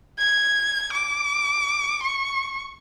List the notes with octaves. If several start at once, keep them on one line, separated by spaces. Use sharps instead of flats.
G#6
D6
C#6